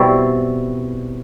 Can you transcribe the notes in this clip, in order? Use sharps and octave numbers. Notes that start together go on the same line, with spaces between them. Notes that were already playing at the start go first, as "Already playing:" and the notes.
Already playing: B2 G3 C4 E4 C#6